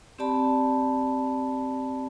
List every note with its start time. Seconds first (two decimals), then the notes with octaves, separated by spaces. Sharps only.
0.19 C4 G4 D5 A5 B5